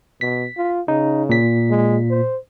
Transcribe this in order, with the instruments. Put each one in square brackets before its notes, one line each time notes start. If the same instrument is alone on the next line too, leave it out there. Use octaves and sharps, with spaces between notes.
[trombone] B2 [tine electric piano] B6
[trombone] F4
[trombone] C#3 [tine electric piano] D#4
[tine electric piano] A#2 B6
[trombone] G#3
C5